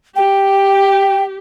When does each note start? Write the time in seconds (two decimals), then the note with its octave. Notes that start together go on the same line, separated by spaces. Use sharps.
0.16 G4 G5